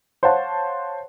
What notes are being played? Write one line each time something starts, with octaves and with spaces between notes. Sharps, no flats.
C5 C#5 F5 F#5 A5